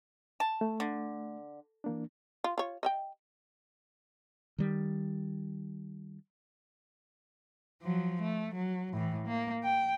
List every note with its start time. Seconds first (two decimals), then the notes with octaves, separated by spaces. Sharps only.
0.40 A5
0.61 A3
0.80 D3
1.84 E3 A#3 D4
2.44 F4
2.58 F4 C#5
2.83 D#5 E5 G5
4.58 D#3 G3
7.82 F3 F#3
8.22 A3
8.55 F#3
8.93 A2 E3
9.27 A#3
9.63 G5